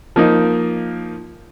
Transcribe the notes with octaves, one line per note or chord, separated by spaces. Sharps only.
F3 A#3 D#4